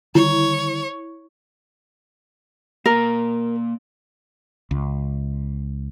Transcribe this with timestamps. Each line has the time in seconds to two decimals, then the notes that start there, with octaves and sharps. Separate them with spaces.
0.15 D3 D#3 G3 E4 C#5
2.86 A#3 A#4 D5
4.71 C#2